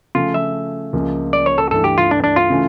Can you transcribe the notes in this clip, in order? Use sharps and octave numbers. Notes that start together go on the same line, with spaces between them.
C#3 F3 A3 F4
E5
C#2 C#3 F3 A#3
D5
C#5
A4
G2 E3 A3 A4
G4
F4
D4
D4
F4
C#3 E3 A3 C#4